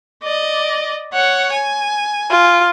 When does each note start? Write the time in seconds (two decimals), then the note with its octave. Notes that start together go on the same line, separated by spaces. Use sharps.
0.24 D5 D#5
1.13 C#5 F#5
1.53 G#5
2.31 F4